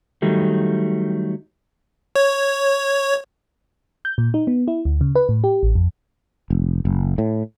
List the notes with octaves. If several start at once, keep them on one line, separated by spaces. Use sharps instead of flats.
D#3 F#3 G3 A3
C#5
G6
A#2
D#4
B3
E4
D2
C#3
B4
A2
G4
A1
F2
F1
F#1
A2